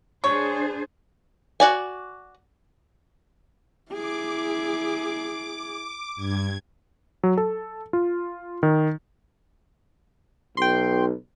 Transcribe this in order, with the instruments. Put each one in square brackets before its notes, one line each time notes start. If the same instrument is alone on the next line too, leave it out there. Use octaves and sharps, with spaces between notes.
[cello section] D4 G#4 C5 [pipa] C#5
[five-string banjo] F#4 D5 G#5
[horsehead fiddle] E4 G#4 [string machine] D6
[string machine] G2 G#6
[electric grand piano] F#3
A4
F4
D#3
[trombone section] B1 [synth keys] G5 C6